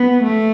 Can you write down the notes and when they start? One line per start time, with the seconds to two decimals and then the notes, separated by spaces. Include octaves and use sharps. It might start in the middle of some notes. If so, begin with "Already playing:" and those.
Already playing: B3
0.23 A3